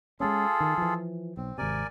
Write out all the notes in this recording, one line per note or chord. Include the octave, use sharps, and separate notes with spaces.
G#3 A#3 C#4 F4 G#4 A4
D#3
E3 F3
B1 C4
G#1 C3 A#4 D5 G#5